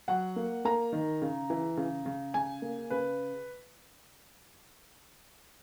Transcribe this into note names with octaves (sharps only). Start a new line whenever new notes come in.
F#3 F#5
A#3
A#3 A#5
D#3
C#3
E3
C#3
C#3
C#3 G#5
A#3
C#3 B4